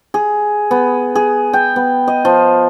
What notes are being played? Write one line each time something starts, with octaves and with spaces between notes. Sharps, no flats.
G#4
B3
G#4
G5
B3
D#5
F3